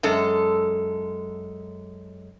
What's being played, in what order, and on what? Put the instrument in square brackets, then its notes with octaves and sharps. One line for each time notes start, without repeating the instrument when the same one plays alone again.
[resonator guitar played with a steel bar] F#2 G#3 A4